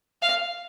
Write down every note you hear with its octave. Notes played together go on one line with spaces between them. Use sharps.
F5